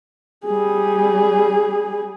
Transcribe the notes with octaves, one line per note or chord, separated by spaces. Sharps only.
G3 G#4